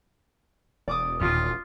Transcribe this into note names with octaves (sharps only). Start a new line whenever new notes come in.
E1 D5 D6 D#6
D#2 A#2 F4